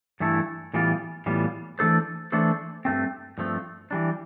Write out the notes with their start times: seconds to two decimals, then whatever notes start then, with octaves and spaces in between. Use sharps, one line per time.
0.20 G2 E3 A3 E4 A4
0.73 A2 E3 G3 B3 F4
1.26 A2 E3 G3 B3 F4
1.79 E3 A3 D4 A4 C5
2.32 E3 A3 D4 A4 C5
2.85 G2 F3 A3 C4
3.38 G2 F3 A3 C4
3.91 E3 G3 D4